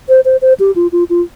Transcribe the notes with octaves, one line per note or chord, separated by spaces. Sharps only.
C5
C5
C5
G4
F4
F4
F4